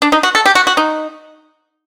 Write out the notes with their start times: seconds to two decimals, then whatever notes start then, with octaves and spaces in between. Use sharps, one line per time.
0.02 D4
0.12 D#4
0.23 F#4
0.35 A4
0.46 G4
0.55 F#4
0.67 F#4
0.77 D#4